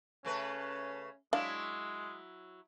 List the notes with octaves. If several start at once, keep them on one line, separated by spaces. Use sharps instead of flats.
C#3 A3 C#4 B4
F#3 G#3 D4 E4 F5